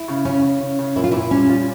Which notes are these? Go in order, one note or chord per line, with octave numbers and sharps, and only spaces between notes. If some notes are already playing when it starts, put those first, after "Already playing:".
Already playing: E4
C#3
C#3 C#4
C#3
C#3
C#3
A#2 E4
F4
A#2 E4
G3 C#4
F4